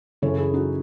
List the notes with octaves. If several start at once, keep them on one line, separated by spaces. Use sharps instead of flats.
F#2 C#3 E3 A4 C#5
E4 G#4
D#4 F#4